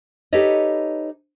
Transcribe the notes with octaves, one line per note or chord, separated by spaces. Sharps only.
D#4 G4 A4 B4 C#5 D#5